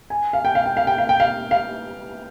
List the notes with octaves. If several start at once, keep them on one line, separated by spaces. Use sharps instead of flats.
G#5
F5
G5
F5
G5
F5
G5
F5
G5
F5
F5